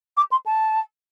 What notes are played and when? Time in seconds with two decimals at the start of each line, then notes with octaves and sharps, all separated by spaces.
0.17 D6
0.31 C6
0.45 A5